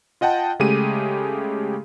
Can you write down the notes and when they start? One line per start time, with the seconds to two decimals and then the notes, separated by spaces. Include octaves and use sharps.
0.21 F4 D#5 F#5 G5 A5
0.60 C#3 G#3 A3 G4 G#4 D#7